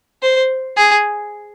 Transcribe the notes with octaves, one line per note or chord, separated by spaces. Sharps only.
C5
G#4